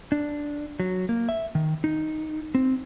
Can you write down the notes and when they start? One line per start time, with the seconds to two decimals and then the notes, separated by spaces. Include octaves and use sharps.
0.12 D4
0.80 F#3
1.09 A#3
1.29 E5
1.55 D#3
1.84 D#4
2.55 C4